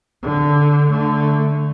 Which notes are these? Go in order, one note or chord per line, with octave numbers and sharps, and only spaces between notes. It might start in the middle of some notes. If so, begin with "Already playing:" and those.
D3
D3 A3